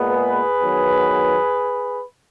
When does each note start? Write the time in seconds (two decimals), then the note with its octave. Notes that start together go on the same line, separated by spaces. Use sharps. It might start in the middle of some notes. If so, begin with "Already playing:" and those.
Already playing: A#2 G#3 B3
0.11 G#4 B4
0.60 D#3 F#3 B3